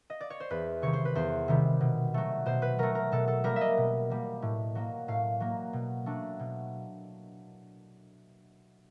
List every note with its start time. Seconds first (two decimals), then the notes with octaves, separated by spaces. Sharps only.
0.10 D#5
0.20 D5
0.30 C#5
0.40 C5
0.50 E2 B4
0.82 C3 D#3 G3 C#5
0.93 C5
1.05 B4
1.15 E2 C5
1.48 C3 D#3 G3
1.81 B2
2.14 F#3 A3
2.46 B2 C5
2.62 B4
2.78 F#3 A3 A#4
2.95 A#4
3.12 B2 A4
3.28 A4
3.44 G3 A#3 A#4
3.56 E5
3.61 D#5
3.77 B2
4.10 G3 A#3
4.42 A2
4.75 F#3 A#3
5.08 A2 F5
5.40 F#3 A#3
5.73 B2
6.06 F#3 A3 D4
6.39 B2